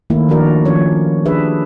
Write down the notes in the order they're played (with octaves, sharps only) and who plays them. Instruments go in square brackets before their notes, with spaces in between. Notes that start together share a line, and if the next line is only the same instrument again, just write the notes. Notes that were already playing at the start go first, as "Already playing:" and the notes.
[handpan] D#3 A3 A#3 E4
D#3 F3 D4 F#4 A#4 D5
F3 C#4 C#5
D4 G4 G#4 B4 E5